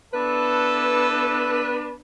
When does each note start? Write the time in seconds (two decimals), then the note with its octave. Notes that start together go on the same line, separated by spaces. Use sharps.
0.14 B3 D4 E4 A4 B4